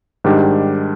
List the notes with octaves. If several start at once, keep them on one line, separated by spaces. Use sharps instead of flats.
G#2 D#3 G3 D4 G4